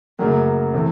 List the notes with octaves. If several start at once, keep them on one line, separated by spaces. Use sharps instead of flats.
F#2 C#3 F#3 A3 A#3
C3 E3 A3